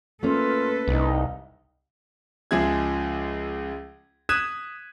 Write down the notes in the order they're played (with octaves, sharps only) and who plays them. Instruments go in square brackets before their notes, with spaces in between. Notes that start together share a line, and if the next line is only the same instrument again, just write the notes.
[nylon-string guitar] A3 A#3 C#4 [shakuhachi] F4 [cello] A4 B4
[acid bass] C2 [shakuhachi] D#4
[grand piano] C#2 F3 G#3 G#4 E5 G#6
D#6 F#6 G#6 B6 D#7 E7